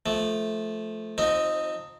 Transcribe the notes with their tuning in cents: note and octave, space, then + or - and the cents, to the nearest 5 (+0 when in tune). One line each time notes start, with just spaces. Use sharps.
F3 +0 A3 -10
F3 +30 C4 +0 D#4 +0